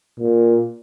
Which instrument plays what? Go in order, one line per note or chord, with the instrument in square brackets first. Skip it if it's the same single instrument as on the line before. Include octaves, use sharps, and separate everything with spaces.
[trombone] A#2